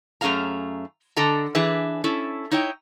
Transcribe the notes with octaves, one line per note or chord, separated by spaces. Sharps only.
F#2 A3 C#4 G#4 F5 A#5
D3 D4 A4 D#5 A#5
E3 D4 G#4 B4 E5
C#4 E4 A4
D#4 E4 C#5 D#5 G5